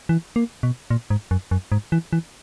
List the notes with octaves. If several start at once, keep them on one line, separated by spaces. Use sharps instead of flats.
E3
A#3
B2
A#2
G#2
F#2
F#2
G#2
E3
E3